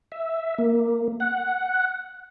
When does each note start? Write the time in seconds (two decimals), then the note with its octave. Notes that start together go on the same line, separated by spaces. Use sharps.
0.12 E5
0.58 A#3
1.20 F#5